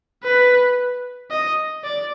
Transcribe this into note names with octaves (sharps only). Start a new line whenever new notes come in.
B4
D#5
D5